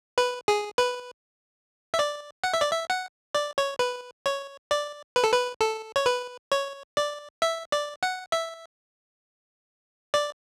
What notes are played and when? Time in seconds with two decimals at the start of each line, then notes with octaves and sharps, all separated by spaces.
0.18 B4
0.48 G#4
0.78 B4
1.94 E5
1.99 D5
2.44 F#5
2.54 E5
2.61 D5
2.71 E5
2.90 F#5
3.35 D5
3.58 C#5
3.79 B4
4.26 C#5
4.71 D5
5.16 B4
5.24 A4
5.33 B4
5.61 A4
5.96 C#5
6.06 B4
6.52 C#5
6.97 D5
7.42 E5
7.72 D5
8.03 F#5
8.32 E5
10.14 D5